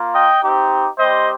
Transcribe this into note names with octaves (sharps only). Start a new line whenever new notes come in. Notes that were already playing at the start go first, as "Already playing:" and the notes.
Already playing: A#3 F4
D#5 G5
C4 D#4 G4
G3 C4 G4 C5 D#5